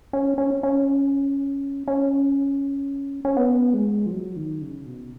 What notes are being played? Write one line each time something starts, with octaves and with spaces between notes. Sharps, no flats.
C#4
C#4
C#4
C#4
C#4
B3
G#3
F3
F#3
D#3
C#3
B2